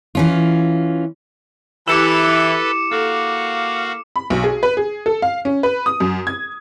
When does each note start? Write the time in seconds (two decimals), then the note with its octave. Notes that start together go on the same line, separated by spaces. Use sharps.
0.15 E3 C#4 F4
1.88 E3 E4 G4 A4 B4 D6 C#7 E7
2.92 A#3 F#4 A4 F5
4.16 B5
4.30 B1
4.44 G#4
4.63 B4
4.77 G#4
5.06 A4
5.22 F5
5.45 C#4
5.63 B4
5.86 D#6
6.00 F#2
6.27 G#6